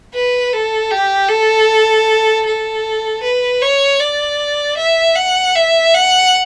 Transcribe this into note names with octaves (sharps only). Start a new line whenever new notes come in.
B4
A4
G4
A4
A4
B4
C#5
D5
E5
F#5
E5
F#5